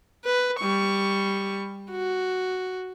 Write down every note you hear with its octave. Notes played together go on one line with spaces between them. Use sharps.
B4
G3 C#6
F#4